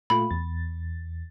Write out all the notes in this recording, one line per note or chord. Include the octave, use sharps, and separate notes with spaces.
A#2 A3 F4 B5
E2 A6